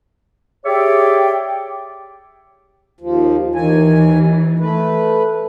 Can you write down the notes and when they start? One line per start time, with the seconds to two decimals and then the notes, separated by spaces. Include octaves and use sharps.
0.65 G4 G#4 C#5 D5 E5 G5
3.01 D#2 F3
3.55 D#2 D#3 E3 G#5
4.60 A3 B4